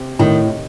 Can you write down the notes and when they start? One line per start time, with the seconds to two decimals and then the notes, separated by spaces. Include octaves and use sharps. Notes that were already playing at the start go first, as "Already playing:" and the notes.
Already playing: C3 C4
0.19 A2 D#3